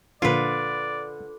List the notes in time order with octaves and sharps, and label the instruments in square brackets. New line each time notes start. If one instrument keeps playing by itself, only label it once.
[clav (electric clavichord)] A#2 F3 [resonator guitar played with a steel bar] D3 [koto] F4 B4 [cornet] D5